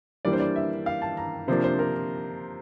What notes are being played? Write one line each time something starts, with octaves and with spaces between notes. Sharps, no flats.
E3 G3 A#3 D4 D5
C5
D5
E5
F5
A5
A#5
C3 F3 A#3 D4 C5
C5
A#4